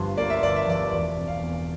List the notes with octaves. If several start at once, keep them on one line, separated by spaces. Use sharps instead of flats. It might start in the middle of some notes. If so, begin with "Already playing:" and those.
Already playing: G1 G2 F3 C6
A#3 D5
E5
G1 D5
E5
F3 D5
E1 D5
C3
F5
E2